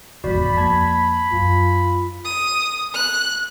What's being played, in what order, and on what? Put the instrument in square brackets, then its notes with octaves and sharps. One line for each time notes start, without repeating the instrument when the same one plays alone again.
[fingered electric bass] F1 E2 G#2 [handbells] F#4 D5 [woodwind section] B5
[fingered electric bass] F2 A#3 [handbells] A5 G#6
[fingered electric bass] F#2 [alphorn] F4
[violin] D#6
F#6